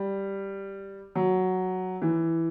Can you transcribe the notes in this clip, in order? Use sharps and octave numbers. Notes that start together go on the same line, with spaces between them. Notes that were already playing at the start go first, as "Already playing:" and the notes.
Already playing: G3
F#3
E3